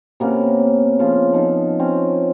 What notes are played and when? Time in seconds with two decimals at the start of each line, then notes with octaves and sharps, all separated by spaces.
0.20 C3 A#3 B3 C#4
0.99 C#3 F3 F4
1.33 F3 D#4 A4
1.79 C4 C#4